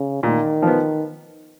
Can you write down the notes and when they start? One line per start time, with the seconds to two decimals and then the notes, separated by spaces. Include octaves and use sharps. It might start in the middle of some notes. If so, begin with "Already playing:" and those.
Already playing: C#3
0.23 A#2 D#3
0.62 F3 B3